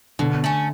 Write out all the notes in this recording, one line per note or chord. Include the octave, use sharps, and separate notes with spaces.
B2 D3
A3 C#4